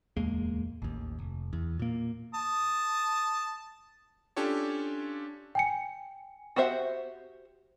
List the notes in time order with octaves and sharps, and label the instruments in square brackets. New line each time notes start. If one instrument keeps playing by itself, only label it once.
[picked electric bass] D1 E2 G#3 A#3
A1 D#2
F1
E2
A#2 A#3
[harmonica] A5 D#6
[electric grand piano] C#4 D4 F4 G4 A4 C#5
[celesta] G5 G#5 C#7
[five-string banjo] F#4 G4 C5 E5 F#5